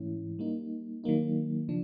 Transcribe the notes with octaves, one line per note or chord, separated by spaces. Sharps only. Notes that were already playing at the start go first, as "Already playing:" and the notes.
Already playing: G#2 E3 A3 C#4 E4
G3 A#3 D#4
D#3 F#3 A#3 D#4
C#3 F3 D4